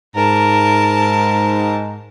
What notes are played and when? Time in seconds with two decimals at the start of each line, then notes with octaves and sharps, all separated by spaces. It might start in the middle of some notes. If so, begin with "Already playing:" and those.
0.15 G#2 A#4 A5